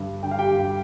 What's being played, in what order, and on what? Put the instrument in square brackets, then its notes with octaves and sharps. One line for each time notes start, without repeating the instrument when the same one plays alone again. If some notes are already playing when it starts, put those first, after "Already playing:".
Already playing: [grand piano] G2 D3
D3 G5
F5
G4 G5
G2